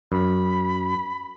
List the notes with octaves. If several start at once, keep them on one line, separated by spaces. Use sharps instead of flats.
F#2 B5